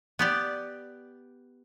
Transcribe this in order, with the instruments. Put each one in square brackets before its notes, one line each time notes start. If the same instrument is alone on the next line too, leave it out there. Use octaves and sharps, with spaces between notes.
[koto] B3 G4 D5